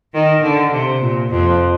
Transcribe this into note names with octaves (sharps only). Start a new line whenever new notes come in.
D#3
D3
C3
A#2
F2